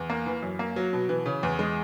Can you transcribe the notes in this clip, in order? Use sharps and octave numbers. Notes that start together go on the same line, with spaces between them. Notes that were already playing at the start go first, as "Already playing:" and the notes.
Already playing: E2
A#3
E3
F#2
A#3
F#3
B2
E3
C#3
E2
G#3